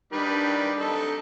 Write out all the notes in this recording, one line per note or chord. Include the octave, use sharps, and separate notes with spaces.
D#3 G3 D4 B4
D#4 A4